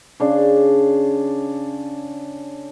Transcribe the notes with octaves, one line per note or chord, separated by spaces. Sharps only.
C#3 D4 C6